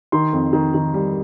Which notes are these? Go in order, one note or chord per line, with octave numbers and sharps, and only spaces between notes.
D#3 C6
F2
D#3
D#3
G3